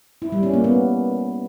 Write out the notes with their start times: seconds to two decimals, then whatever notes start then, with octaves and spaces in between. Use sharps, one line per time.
0.22 E4
0.32 G3
0.43 C#4
0.53 A#3
0.64 B3